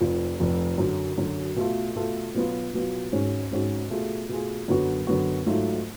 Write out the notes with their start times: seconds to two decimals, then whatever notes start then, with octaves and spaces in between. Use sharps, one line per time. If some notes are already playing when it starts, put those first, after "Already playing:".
0.01 F1 F2 F3
0.39 F1 F2 F3
0.78 F#2 D3 F#3
1.18 F#2 D3 F#3
1.56 B2 A3 F4 A4
1.95 B2 A3 F4 A4
2.35 B2 F#3 B3 F4
2.73 B2 F#3 B3 F4
3.12 G#1 G#2 G#3 C#4 F#4
3.51 G#1 G#2 G#3 C#4 F#4
3.90 B2 A3 F4 G#4
4.29 B2 A3 F4 G#4
4.68 F#2 D3 F#3 B3 F#4
5.07 F#2 D3 F#3 B3 F#4
5.46 G#2 F#3 A3 F4